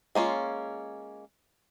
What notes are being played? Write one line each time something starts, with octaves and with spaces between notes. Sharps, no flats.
G#3 A#3 C#4 F4